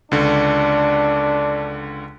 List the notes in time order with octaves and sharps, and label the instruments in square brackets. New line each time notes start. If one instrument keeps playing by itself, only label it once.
[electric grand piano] C#2 D3 [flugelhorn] D4